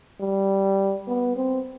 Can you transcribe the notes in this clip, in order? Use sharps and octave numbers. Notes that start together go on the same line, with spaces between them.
G3
B3
C4